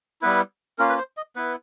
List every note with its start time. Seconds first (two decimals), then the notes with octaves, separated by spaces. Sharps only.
0.22 G3 B3 E4 B4
0.78 A#3 C#4 F4 A#4
0.89 B4
0.98 C5
1.17 D#5
1.36 B3 E4 B4